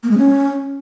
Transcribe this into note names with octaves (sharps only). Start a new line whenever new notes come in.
A#3
G#3
C#4